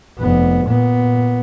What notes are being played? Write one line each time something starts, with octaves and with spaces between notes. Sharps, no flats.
F1 B3
A#2 B3